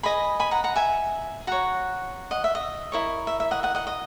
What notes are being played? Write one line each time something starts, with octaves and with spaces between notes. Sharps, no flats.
G#4 B4 D#5 G#5 B5
G#5 B5
F#5 A#5
F#5 A#5
E5 G#5
F#4 C#5 F#5 A#5
D#5 F#5
E5
D#5
E4 A#4 C#5
E5
E5
D#5 F#5
D#5 F#5
D#5 F#5
D#5